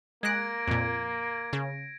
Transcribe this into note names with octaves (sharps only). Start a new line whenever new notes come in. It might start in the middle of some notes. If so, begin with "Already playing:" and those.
G#3 A#3 F#6 G#6 A#6 D7
F2 A#2
C#3